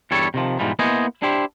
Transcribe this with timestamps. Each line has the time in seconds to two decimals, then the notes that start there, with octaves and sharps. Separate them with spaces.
0.11 E2 G2 G3 A4 C#5
0.34 C3 D#3 F3
0.59 G#2 B2 E3 F3 G3
0.79 A#3 B3 E4 C5 D#5 G#5
1.22 D4 E4 G4 C5